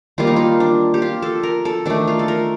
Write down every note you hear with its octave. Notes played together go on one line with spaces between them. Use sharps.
D#3 G3 A#3 F4
D#4
F4
D4
G4
F4
A4
A#4
A4
D#3 A3 D4
F4
A4
A#4